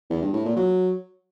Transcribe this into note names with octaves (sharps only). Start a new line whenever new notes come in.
E2
G2
A2
A#2
F#3